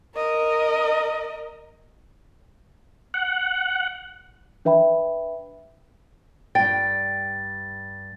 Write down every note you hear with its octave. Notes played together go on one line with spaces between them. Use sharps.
A#4 D#5
F#5
D4 B4 E5 G5 B5
G2 G5 A6